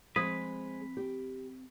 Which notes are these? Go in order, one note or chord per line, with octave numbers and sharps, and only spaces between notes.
F3 G#3 C4 G#4 B4 C5 D#6 G#6
G4